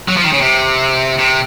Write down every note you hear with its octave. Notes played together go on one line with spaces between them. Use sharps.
F#3
F3
D#3
C#3
C3
C3